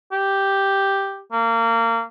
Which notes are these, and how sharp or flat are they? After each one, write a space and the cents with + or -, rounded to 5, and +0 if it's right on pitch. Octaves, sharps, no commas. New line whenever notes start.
G4 +0
A#3 -25